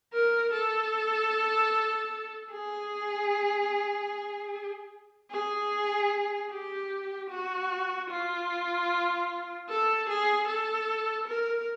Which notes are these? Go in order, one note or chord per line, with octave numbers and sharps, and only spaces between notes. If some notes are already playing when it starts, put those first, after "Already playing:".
A#4
A4
G#4
G#4
G4
F#4
F4
A4
G#4
A4
A#4